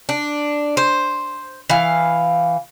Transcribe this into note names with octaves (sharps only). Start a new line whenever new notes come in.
D4
C5
E3 F5